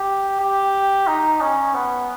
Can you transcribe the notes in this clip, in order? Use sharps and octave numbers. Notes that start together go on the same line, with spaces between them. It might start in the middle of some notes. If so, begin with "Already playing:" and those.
Already playing: G4
G4
D#4
C#4
B3